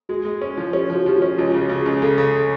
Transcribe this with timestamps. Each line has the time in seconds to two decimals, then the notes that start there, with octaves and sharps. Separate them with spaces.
0.09 G#3 F#4
0.25 G#3
0.42 C#4
0.57 F3
0.73 C#4 G4
0.90 F3
0.95 F#4
1.06 F3 G4
1.17 F#4
1.22 C#4
1.38 C#2 F4
1.54 C#3
1.59 F#4
1.69 C#3
1.81 C#2 G#4
2.02 C#3 A4
2.18 C#3